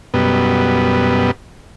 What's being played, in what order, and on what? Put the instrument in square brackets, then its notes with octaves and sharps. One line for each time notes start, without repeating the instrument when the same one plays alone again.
[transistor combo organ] F#2 B2 G3 B3